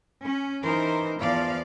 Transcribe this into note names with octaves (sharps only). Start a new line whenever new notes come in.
C#4
E3 D#4 A#4 C5
E2 F3 D5 F5